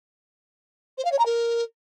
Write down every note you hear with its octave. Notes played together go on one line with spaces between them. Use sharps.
C5
F5
C#5
A#5
A#4